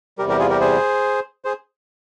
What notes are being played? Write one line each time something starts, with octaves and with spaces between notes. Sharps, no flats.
E2 C3 G3 G4 A#4
G4 A#4
F4 G#4
G4 A#4
G#4 C5
G#4 C5